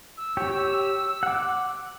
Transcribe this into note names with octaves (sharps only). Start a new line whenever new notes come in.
E6
G4 C#5 G5
F#5 D6